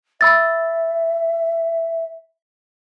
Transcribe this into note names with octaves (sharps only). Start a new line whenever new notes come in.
E5 B5 E6 A6